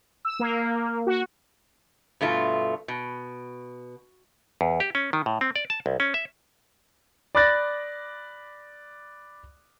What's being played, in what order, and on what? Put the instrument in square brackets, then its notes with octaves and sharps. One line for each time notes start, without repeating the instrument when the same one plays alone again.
[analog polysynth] E6
A#3
F#4
[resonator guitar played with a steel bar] G2 B2 A3 F4
B2
[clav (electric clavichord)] E2
G4
C#4
D#3
A2
C4
D5
A5
C2
C#4
E5
[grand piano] D5 B5 D6 F#6 A6 A#6